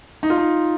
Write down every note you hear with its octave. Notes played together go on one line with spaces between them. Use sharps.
D#4
F4
D#4